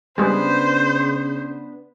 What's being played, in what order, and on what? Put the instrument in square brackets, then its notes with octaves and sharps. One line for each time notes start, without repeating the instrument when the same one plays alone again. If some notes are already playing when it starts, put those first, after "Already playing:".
[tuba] C#3 [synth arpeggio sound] G3 G#3 [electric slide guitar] B3 D4 B4 [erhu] C5